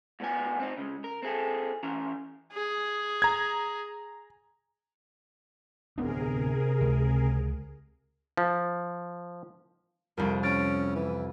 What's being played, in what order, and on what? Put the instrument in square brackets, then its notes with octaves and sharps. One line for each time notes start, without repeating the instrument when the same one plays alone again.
[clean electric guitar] G#2 B2 B3 G#5
C4 D#4
C#3 G#3
A#4
C4 G#4 A4
E3 C#4 A#5
[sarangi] G#4
[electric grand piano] A#5 G#6
[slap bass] D1 B3 D4 [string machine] C3 G#4 A#4
[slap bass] C#2
[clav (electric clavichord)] F3
[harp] C2 F2 [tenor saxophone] A#4
[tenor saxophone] C#4 [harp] F6 A6 D7
[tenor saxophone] E3